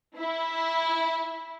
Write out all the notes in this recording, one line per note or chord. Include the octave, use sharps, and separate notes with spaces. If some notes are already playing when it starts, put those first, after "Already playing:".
E4